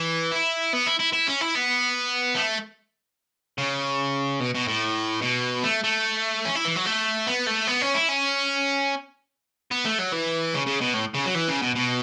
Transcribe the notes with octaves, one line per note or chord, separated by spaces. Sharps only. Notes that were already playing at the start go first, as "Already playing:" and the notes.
Already playing: E3
E4
B3
E4
E4
E4
C#4
E4
B3
A3
C#3
B2
B2
A2
B2
A3
A3
C#4
E4
E3
F#3
A3
B3
A3
B3
C#4
E4
C#4
B3
A3
F#3
E3
C#3
C#3
B2
A2
C#3
F#3
E3
C#3
B2
B2